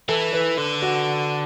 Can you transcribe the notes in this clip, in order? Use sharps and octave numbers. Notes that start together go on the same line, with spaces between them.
E3 A4
B4
D3
F#4